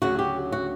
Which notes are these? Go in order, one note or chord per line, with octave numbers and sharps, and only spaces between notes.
D2 C#3 F#3 F#4
G4
F#4